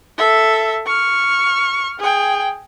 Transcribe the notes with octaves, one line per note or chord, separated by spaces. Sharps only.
A4 E5
C#6 F6
G#4 G5